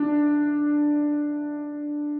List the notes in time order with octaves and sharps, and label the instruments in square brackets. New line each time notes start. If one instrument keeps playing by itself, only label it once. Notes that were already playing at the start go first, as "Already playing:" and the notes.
Already playing: [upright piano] D4